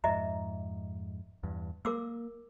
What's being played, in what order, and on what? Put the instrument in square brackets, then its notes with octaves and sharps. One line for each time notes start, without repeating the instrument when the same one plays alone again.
[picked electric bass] F2 G#2 [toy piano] D#5 E5 A#5
[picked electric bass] E2 G2
[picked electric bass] A#3 [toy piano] A#4 D6 E6